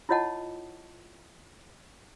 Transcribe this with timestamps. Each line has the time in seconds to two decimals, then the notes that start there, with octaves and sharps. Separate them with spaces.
0.09 E4 F4 C#5 D#5 F#5 A5